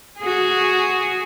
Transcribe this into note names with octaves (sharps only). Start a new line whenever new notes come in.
F#4 G#4